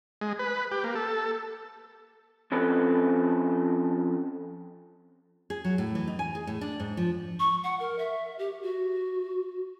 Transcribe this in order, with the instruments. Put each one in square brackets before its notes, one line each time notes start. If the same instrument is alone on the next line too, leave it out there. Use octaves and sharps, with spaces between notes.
[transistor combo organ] G#3
B4
G4
A#3
A4
[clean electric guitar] F3 C4 C#4 A4 B4
[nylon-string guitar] G#4
F#3
A2
E3
D#4
G#5
G#4
A2
D4
G#2
F3
[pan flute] C#6
F#5
A#4
E5
G4
F#4